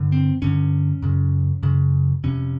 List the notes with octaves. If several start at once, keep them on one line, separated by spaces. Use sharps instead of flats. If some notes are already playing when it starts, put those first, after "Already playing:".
Already playing: G2 D3
C4
G2 D3 C#4
F#2 C#3
F#2 C#3
F2 C3 C#4